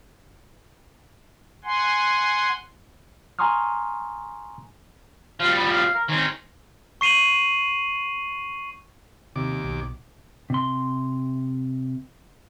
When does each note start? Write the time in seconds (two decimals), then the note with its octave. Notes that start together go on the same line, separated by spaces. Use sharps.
1.64 F#5 G#5 C6
3.39 G#5 A#5 C6 C#6 D#6 F6
5.40 F3 G3 F5
5.57 B5
5.70 F5
5.95 A#4
6.09 D#3 C4 C#4
7.01 C#6 C7 D#7 F7 F#7
9.36 D#2 C3 D6
9.63 B1
10.50 C3 C6